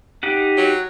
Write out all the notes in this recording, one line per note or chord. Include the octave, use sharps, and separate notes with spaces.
D#4 G4 F#5
F#3